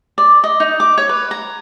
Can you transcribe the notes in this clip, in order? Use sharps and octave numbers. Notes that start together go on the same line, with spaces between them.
D5
D#5
D#4
D6
C#5
B4
A#5